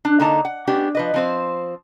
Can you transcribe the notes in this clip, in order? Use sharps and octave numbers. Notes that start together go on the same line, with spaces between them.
D4
D3 A#3 D#4 D#5 A5
F#5
G#3 B3 C#4 D4 G4
F3 B4 D#5
F3 C4 C5